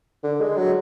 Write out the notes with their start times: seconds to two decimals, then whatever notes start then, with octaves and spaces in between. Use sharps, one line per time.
0.24 D3
0.41 G#3
0.57 F#3